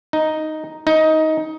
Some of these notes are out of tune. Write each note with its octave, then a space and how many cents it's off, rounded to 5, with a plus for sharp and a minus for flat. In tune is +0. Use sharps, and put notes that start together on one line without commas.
D#4 +0
D#4 +15